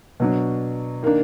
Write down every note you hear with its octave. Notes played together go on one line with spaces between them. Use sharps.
B2 F#3 D4
D#3 A#3 D4